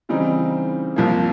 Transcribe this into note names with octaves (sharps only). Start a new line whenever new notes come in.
C#3 E3 G3 C4 D#4
C2 C3 F3 A#3